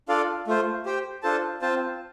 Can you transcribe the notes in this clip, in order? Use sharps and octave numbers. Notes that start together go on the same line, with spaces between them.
D4 F4 A4 D5 F5
A3 F4 C5
G4 C5 G5
D4 F4 A4 C5 A5
C4 F4 C5 A5